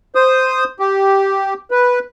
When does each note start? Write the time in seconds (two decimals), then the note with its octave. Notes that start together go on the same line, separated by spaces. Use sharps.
0.15 C5 D#6
0.79 G4
1.71 B4